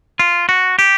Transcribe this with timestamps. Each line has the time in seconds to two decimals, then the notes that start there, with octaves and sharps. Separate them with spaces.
0.19 F4
0.49 F#4
0.79 G4